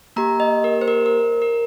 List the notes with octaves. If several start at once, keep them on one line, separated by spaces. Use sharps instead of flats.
A#3 G4 A#5
D#5
A#4
C5
A#4
A#4
A#4